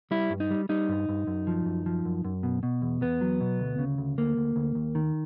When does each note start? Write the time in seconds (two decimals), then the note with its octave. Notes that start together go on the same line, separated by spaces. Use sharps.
0.11 G3 E4
0.30 G2
0.40 D#4
0.51 G3
0.69 G3 D#4
0.89 G2
1.09 G2
1.27 F#2
1.47 F3
1.65 F#2
1.86 F3
2.05 F#2
2.25 F#2
2.43 B2
2.63 B2
2.82 E2
3.02 E2 B3
3.21 F#3
3.40 B2
3.60 D2
3.79 C#3
3.98 D2
4.18 D2 A#3
4.37 D2
4.56 D2
4.75 D#2
4.95 D#3